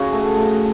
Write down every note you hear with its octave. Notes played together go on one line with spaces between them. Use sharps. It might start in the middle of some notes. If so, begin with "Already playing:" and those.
Already playing: C#3 F#4 G#4
A3
A3